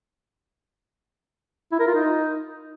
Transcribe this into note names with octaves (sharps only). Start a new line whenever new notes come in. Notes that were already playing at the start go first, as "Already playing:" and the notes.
E4
A#4
F4
D#4